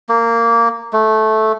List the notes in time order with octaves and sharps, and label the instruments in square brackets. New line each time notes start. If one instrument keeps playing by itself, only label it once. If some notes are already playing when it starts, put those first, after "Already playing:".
[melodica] A#3
A3